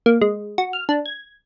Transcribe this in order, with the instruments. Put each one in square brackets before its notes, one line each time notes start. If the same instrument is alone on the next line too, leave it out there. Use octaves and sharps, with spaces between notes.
[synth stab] A#3
G#3
F#4
F6
D4
G#6